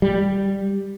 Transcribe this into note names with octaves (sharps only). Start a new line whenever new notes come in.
G3